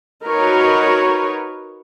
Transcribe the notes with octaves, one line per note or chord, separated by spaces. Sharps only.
D#4 F#4 A#4 B4 C#5